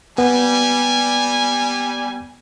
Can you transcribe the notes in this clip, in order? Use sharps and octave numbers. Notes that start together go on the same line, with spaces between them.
G3 B3 G#5